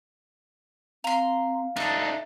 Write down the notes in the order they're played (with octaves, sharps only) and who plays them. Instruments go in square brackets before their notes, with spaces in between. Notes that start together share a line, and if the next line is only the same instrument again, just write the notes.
[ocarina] C4 [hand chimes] F5 [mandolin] A#5 C6
[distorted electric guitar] D4 D#4 [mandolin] A4 [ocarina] E5